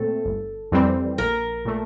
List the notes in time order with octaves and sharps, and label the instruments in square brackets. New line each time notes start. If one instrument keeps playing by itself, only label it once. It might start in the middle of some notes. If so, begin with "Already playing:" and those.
Already playing: [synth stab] A#2 A3 C4 [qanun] A4
[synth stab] G1
F2 E3 G3 C4
[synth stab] A#1 [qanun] A#4
[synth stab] A#2 A3